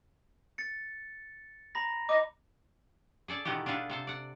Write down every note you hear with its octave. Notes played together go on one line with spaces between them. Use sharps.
A6 C#7
A#5 B5 A#6
D#5 D6
G#4 A4 D5 A5
B2 D#3 E3 B3 F#4 G4
D4 F4 G#4 A4 B4
C3 A4 C5
D5 F#5